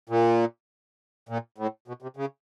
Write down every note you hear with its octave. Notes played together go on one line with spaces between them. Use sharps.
A#2
A#2
A2
B2
C3
C#3